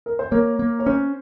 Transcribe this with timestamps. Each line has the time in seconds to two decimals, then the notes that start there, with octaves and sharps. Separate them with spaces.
0.06 A#4
0.19 C5
0.31 A#3 A#4 C#5
0.59 A#3
0.79 C#5
0.86 C#4 C5